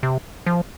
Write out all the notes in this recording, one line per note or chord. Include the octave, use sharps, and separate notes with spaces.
C3
F3